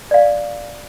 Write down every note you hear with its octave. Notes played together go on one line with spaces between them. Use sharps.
D5 F5